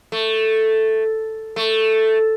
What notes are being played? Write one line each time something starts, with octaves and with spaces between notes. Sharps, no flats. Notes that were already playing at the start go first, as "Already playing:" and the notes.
A3
A3